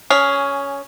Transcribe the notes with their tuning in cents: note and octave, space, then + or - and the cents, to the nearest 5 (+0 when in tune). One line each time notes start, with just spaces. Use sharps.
C#4 +10 G#4 +0